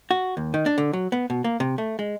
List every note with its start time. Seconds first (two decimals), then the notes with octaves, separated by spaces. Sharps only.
0.11 F#4
0.37 D#2
0.54 D#3
0.66 D4
0.78 D3
0.93 F#3
1.12 B3
1.30 B2
1.44 A#3
1.60 C3
1.78 A3
1.99 G#3